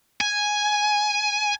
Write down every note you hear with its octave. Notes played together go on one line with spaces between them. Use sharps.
G#5